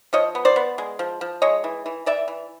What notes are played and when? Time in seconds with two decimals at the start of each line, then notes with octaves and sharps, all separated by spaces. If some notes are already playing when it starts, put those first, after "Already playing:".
0.13 F3 C#5 D#5
0.35 B3
0.45 C5 D5
0.56 B3
0.78 G#3
0.99 F3
1.21 F3
1.42 G#3 C#5 D#5
1.64 E3
1.86 E3
2.06 E3 D5 E5
2.28 E3